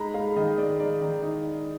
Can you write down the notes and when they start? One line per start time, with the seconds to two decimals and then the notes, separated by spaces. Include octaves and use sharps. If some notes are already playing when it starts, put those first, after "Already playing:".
Already playing: G#3 D#4 A#5 B5
0.14 G#3 F5
0.36 D#3 D#5
0.58 G#3 D5
0.80 D#3 D5
1.02 D#3
1.23 D#4